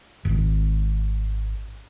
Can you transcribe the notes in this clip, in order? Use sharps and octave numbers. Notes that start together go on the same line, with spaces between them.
D#1 G#1